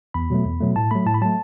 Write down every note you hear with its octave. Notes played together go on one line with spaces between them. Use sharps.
E2 B5
B2 F#3 A3
E2
B2 F#3 A3
A2 A5
F#3 A3 B5
A2 A5
B5
F#3 A3 A5